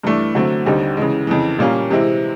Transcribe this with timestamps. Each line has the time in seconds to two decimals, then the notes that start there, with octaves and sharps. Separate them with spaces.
0.03 G2 E3 A3 D4
0.35 D3 F#3 A3 C4
0.65 D#2 D3 G3 C4 D#4
0.97 C#3 E3 G#3
1.27 F2 C#3 E3
1.59 A#2 G3 A#3 C#4 F4
1.90 C3 E3 G#3 C4 E4